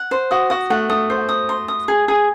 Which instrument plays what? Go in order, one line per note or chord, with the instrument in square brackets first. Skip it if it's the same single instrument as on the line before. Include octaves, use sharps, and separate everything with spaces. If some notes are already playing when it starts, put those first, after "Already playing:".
Already playing: [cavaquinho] F#5
C5
[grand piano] F#4 [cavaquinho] D#6
[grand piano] F#4 [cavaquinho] D#6
[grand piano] A3 [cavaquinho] F#5
[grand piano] A3 [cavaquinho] D#6
[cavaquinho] C5
D#6
C6
D#6
G#4
G#4